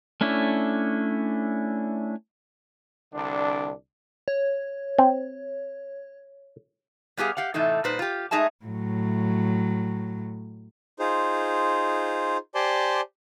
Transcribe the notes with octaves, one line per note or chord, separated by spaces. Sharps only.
A3 C#4 D4 E4
C2 D3 D4
C#5
C4
G3 B3 G4 G#4 F5
G4 F5 F#5
A2 C3 E3 A3 D#4
A#2 G3 D#4 B4 C5
F4 G4
G#3 A3 D#4 G#4 E5 A5
A2 F#3
D#4 F4 G#4 C5
G4 C5 D5 G#5 A5 C6